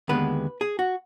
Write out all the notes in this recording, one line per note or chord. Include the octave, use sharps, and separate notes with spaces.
D#2 D3 G#3 B3 B4
G#4
F#4